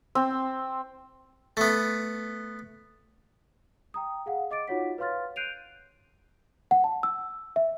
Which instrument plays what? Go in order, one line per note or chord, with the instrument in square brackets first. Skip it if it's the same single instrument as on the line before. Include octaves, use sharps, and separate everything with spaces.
[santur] C4
[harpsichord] A3 B3
[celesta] G5 A#5 D#6
G#4 F5 F#5
D#5 D6 A6 D7
D#4 F4 F#4 C#5 F#5 B6
B4 C#5 F5 C6 F6 A6
F#6 G6 C7 D7 D#7 F7
F#5
A5
E6
E5